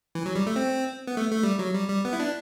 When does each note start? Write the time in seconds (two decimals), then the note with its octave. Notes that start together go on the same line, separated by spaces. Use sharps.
0.15 E3
0.26 F#3
0.36 G3
0.47 A3
0.56 C4
1.07 B3
1.17 A3
1.31 A3
1.43 G3
1.59 F#3
1.74 G3
1.89 G3
2.05 B3
2.13 E4
2.20 D4